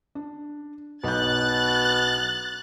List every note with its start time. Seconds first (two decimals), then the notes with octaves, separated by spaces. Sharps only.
0.15 D4
1.04 B1 B2 F#6 G6 A6